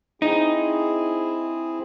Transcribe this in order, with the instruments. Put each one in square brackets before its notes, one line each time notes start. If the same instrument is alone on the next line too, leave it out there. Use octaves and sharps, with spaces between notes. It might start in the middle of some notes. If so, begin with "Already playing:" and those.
[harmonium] C4 E4 G#4 [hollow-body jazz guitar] D#4